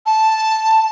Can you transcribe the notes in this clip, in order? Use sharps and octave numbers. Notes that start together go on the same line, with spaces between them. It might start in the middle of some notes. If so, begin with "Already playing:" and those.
A5